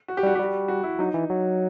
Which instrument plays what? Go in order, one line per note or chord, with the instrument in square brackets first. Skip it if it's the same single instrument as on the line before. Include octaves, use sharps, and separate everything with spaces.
[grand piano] F#4
G4
[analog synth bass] G3 [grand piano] F#4
[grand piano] G4
[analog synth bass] G3 [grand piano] F#4
[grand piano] F#4
E4
[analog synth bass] F#3 [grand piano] D#4
[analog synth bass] E3
F#3